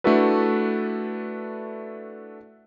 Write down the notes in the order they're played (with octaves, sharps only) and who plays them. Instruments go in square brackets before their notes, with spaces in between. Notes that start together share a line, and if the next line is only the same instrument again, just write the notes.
[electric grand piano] A3 D4 E4 F#4 A4 B4